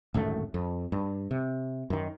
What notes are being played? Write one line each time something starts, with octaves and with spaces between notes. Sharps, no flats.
D1 G#1 F#2 A3
F2
G2
C3
F#2 D#3